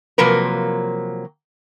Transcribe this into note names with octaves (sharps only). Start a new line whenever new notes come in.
C3 F3 F#3 A#3 A#4 B4